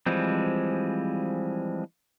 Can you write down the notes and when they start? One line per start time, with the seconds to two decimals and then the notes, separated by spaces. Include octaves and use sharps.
0.06 E3 F3 G3 G#3 C4